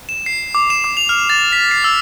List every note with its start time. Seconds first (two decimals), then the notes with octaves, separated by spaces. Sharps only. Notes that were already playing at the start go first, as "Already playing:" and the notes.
0.09 E7
0.26 C7
0.55 D6
0.70 E7
0.84 D6
0.97 F7
1.09 F6
1.30 A6
1.52 B6
1.71 C7
1.84 E6